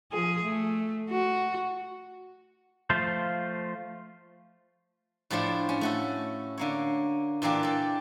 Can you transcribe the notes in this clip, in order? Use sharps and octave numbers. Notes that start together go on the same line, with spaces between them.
F3 G#4
A3
F#4
F3 A3 F4 C5
A2 F3 A3 D4 C5
C#4
A3 F#4 A4
D3 A#3 C#5
A#2 E3 A#3 D4 G4
A4 D5